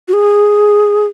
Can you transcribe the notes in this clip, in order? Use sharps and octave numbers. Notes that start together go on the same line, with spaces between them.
F#4
G#4